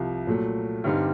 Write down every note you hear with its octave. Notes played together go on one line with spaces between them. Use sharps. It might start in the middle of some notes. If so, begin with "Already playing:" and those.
Already playing: C2 C3 F3
A#2 F#3 A3
G2 D3 G3 C4 D#4